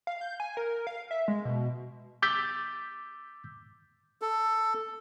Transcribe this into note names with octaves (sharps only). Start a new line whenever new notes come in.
F5
G6
G#5
A#4
F5
E5
G#3
B2
D6 E6 G6 A6 B6
A4